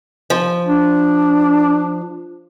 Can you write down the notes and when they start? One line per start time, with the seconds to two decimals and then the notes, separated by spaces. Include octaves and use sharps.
0.30 F3
0.66 D4